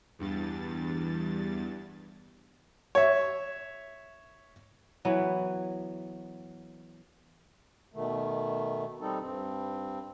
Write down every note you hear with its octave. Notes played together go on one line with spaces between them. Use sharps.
E2 G2 A6
C#5 E5
E3 F#3 B3
B2 D#3 A3
G3 C4 D#4 A4
G2 C4